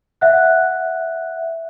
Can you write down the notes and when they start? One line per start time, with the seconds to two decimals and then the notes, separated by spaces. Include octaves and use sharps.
0.21 E5 F#5 F#6